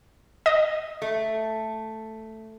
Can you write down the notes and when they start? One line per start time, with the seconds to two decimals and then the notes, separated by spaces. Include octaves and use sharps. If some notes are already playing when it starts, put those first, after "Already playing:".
0.46 D#5
1.02 A3